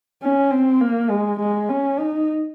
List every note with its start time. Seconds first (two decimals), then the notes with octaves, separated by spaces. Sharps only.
0.23 C#4
0.51 C4
0.81 A#3
1.10 G#3
1.40 G#3
1.69 C#4
1.99 D#4